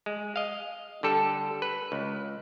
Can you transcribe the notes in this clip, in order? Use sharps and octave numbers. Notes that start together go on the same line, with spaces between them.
G#3
D#5 F5
D3 G3 A4
B4
C#2